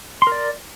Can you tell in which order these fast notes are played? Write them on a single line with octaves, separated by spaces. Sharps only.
C6 A#4 D5